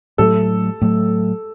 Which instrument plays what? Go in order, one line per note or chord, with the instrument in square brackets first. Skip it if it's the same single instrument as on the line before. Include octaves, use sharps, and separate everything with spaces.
[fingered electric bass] A2 F#3 A3 [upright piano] A4
[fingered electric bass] A2 F#3 A3